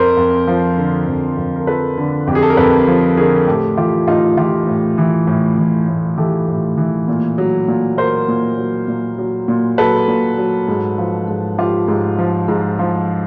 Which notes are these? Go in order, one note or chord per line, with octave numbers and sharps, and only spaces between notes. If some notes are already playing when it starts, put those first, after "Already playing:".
Already playing: F2 A#4 C5
F2
F3
D3
F2
F2
A#4
F3 A4 B4
D3
F2 G4
G#4
A4
A#4
F2 A4 B4
F3
D3 G#4 A#4
A2 G4 A4
E3 F4 G4
A2 D#4 F4
E3 F4 G4
A2
E3
A2
E3
A2
E3 G4 A4
A2
E3
A#2
F#3
A#2
F#3 A#4 C5
A#2
F#3
A#2
F#3
A#2
F#3 A4 B4
A#2
F#3
G#2
F3
G#2
F3 F4 G4
G#2
F3
G#2
F3